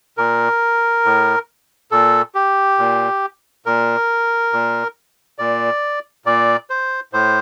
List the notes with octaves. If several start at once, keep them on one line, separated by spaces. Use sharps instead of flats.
A#2 A#4
A2
A#2 A4
G4
A#2
A#2 A#4
A#2
A#2 D5
A#2 D5
C5
A2 C5